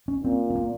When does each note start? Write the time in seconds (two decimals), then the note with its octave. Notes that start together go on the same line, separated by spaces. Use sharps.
0.08 C#4
0.23 A#2 C4
0.50 C4
0.55 A#3